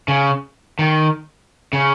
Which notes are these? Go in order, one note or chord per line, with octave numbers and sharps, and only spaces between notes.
C#3
D#3
C#3